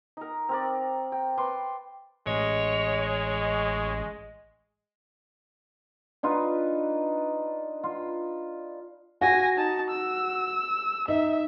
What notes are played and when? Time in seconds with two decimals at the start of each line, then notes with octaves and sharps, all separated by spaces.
0.17 D#4 A#4
0.49 C4 A#4 D5
1.12 G5
1.38 B4 C6 D6
2.27 A1 G#3 C#5 D#5
6.23 D4 D#4 F4 B4
7.83 F4
9.21 F#4 G#5 A#6
9.57 D#4 A5
9.90 E6
11.08 D#4 E5